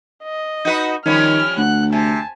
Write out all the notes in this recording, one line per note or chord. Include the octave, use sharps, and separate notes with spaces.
D#5
D#4 F#4 B4
D#3 F3 G3 C#4 F6
D2 F#5 F#6
C3 G#5 A5